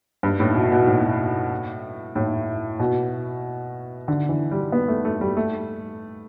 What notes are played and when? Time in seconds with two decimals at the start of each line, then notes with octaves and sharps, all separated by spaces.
0.23 G2
0.40 A2
0.55 B2
0.72 B2
0.87 A2
2.16 A2
2.79 B2
4.08 D3
4.29 E3
4.51 G3
4.72 B3
4.88 A3
5.05 A3
5.21 G3
5.37 A3